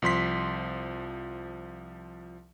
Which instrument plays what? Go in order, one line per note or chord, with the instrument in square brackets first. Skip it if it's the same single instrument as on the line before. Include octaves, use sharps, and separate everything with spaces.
[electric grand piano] C2 F3 C6 B6